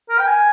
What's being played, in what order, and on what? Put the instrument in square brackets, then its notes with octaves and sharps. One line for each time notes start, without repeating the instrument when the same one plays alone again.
[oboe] A#4
G5
G#5